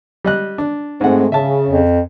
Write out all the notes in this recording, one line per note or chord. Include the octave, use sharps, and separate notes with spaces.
G3 D#5 F#6
D4
G#2 G#3 A3 C4 F#5
C#3 E5 A5
F2